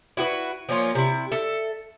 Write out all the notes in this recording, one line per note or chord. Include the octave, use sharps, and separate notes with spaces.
E4 F#4 G4 B4
F3 A#3 C#4 F4
C3 E4
A4 E5